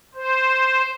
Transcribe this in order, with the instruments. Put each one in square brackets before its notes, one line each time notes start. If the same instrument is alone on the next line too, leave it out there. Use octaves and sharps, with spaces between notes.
[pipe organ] C5